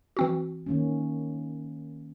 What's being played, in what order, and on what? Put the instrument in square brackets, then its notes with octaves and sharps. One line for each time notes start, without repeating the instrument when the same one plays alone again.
[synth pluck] E3 C4 F#4
[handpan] D#3 A#3 C#4